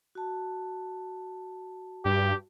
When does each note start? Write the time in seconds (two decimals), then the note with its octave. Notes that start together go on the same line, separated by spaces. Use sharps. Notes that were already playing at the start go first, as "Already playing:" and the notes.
0.15 F#4 A5
2.05 G2 G4